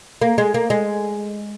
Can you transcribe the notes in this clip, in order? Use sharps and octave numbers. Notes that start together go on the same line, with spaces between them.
A#3
G#3
A#3
G#3